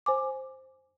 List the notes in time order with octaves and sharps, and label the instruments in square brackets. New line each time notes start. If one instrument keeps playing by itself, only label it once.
[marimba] C5 G#5 D6